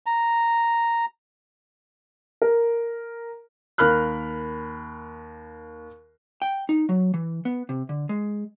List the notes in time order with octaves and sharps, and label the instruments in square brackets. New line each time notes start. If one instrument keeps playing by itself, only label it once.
[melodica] A#5
[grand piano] A#4
[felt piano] D#2 A#4 B5 F6 F#6
[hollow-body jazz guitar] G5
D#4
F#3
E3
B3
C3
D3
G#3